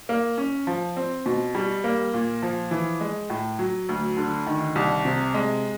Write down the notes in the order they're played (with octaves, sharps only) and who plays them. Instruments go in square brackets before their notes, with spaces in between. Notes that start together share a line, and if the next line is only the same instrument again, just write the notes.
[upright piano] A#3
C#4
F3
C4
B2
G3
A#3
A#2
F3
E3
G#3
A2
F#3
D2
D3
D#3
C2
C3
G#3